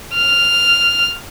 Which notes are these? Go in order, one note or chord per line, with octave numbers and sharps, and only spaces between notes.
F6